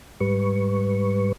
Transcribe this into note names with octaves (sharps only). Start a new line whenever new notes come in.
G#2 G3 B4 C#6